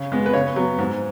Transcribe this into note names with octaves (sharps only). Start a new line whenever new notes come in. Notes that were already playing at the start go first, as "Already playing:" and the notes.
Already playing: C#3
G#3 B3
B4
C#3 C#5
F#3 B3
G#2